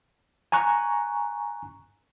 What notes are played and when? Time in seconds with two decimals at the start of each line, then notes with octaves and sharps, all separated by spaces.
0.52 G#5 A#5 C#6 F#6